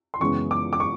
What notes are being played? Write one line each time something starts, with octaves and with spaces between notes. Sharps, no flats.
C6
F#2 C#3 E3 G#3 B3 C#6
D6
D6
C#6